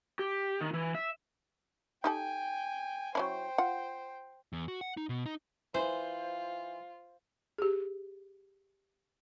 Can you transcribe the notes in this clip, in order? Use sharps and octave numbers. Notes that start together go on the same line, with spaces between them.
G4
D#3
E3
E5
D#4 G4 A4 G5 G#5
F#3 C#4 E4 C5 G5
F4 F#5
E2
F#4
F#5
D#4
B2
D#4
E3 F4 C5
G4 G#4